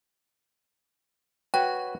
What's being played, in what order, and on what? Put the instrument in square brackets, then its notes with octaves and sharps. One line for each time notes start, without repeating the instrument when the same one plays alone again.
[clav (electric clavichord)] F#4 B4 C#5 [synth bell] G5